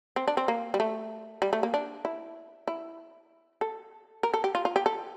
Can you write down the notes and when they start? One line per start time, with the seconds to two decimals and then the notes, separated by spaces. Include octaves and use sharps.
0.16 C4
0.28 D4
0.37 C4
0.48 A#3
0.74 G3
0.80 A3
1.42 G3
1.53 A3
1.63 A#3
1.74 D4
2.05 E4
2.68 E4
3.61 A4
4.23 A#4
4.34 A4
4.44 G4
4.55 F4
4.65 F4
4.76 G4
4.86 A4